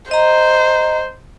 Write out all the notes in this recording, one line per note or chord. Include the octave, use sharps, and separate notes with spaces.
C5 D#5 A#5